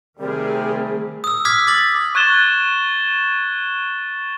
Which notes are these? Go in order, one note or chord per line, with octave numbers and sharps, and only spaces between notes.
C3 D#3 G3 A3 C4 G#4 A#4
D#6 E6
D6 D#6 F6 G#6 B6
D6 A6 F#7
C#6 F#6 G#6 A6 E7 G7